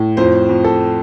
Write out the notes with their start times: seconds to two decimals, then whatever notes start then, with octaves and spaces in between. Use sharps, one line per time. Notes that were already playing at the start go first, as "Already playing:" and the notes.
Already playing: A2
0.17 F2 C5
0.49 F2
0.64 A4